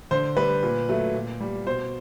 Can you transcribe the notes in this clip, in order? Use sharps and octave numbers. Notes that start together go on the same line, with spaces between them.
D3 C5
G3 B4
A#2
F#3 A3
A#2
G3
B2 C5